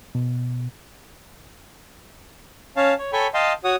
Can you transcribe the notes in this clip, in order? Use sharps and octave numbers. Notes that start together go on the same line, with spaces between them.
B2
C#4 C#5 F5 A5
C#5
A4 C#5 G5 G#5 B5 C#6
D#5 F5 G5 A5 C6
F#4 C#5 F#5 D#6